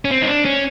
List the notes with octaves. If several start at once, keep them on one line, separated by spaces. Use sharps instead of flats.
C#4
C4
D#4
D4
C#4